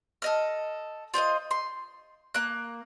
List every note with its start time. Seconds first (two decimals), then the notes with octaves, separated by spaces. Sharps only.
0.22 A4 D#5 F6
1.14 F4 C5 D5 D#5
1.51 C6
2.34 A#3 F#6